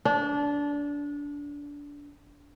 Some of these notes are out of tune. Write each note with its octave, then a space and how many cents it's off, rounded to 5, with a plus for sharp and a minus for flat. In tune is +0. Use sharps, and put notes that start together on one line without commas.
D4 -20